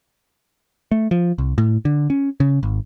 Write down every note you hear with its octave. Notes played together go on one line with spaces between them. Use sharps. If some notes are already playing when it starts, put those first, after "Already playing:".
A3
F3
C2
A2
D3
C#4
C#3
G#1